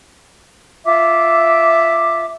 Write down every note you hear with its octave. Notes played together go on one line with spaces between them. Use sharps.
F4 E5 D6